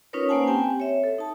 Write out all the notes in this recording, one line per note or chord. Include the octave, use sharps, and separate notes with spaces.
C#4 D#4 F4 A#4 B4 C#5
A#3 C#4 C5 F#5 G#5 A5
C4 G4 G5 G#5
C#5 E5
A4
D#4 A5